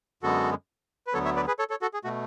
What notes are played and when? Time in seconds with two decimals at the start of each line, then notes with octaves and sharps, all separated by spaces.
0.23 F#2 D3 G#3 B3 F#4 A4
1.07 B4
1.14 D2 D3 F#3 B3 A4 C#5
1.25 C#5 E5
1.36 B4 D5
1.47 G#4 B4
1.59 A4 C#5
1.70 A4 C#5
1.82 F#4 A4
1.94 G#4
2.04 B2 A3 F#4